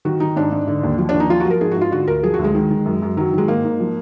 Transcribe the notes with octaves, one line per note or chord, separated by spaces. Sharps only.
D#3 F#4
D#3 D#4
G#2 D4
G#2
D3
D#2
F3
D4
D#2
D#4
F3 F4
F#4
F3 A#4
G#2 G#4
F#4
G#2 F4
D3 F#4
D2 A#4
F3 G#4
F#4
D2
G#3
D#3
D#3
F#2
F#2
D#3 F#3
D#3 G#3
G#2 A#3
G#2
F3